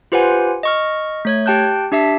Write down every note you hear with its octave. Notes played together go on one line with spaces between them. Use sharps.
F4 G4 B4 C5 F#5 G#5
D#5 C#6 F6
A3 C#5 G#6
G4 G5 A5 F#6 G6
D4 G4 E5 A5 B6 C7